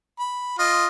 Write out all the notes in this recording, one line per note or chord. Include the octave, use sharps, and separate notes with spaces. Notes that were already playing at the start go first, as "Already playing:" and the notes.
B5
F4 D#5